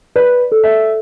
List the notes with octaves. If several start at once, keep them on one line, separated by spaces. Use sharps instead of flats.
B4 D5
A4
E5